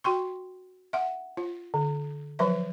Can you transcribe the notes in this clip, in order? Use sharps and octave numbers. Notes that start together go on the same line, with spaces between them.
F#4 G5 C6 C#6
E5 F#5
F4
D3
F3 F#3 B4 E5